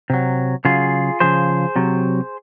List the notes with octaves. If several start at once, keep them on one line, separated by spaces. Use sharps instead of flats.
C3 F#3
C#3 F#3 F4 G#4
C#3 F3 G#4 C5
C3 F#3